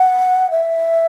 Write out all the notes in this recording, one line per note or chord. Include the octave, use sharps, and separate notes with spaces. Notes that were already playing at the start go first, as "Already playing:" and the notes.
Already playing: F#5
E5